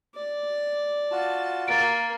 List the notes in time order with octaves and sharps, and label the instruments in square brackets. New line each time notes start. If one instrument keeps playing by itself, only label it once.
[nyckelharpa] D5
[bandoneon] F4 F#4 [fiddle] A5
[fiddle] A#3 A#4 [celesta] A6 D7